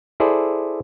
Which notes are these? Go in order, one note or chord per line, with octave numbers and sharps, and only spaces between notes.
E4 G#4 A4 C5 D5